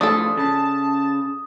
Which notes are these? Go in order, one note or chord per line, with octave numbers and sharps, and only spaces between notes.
F2 A2 F3 A3 D4 G#4 A4 D#6
C#3 A5